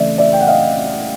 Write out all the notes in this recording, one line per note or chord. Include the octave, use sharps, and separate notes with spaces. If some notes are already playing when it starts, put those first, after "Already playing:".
Already playing: C#3 E3 A3 D5 E5
D5 E5
G5
F#5
D#5 F5